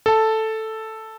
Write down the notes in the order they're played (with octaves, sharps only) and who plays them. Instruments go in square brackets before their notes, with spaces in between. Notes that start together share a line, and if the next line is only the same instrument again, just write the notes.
[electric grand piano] A4 A5